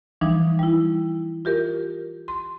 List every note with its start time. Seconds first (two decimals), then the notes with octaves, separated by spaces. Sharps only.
0.21 E3 F3 G3 D4 D#4
0.59 G3 E4
1.45 F4 G4 A#4
2.28 C6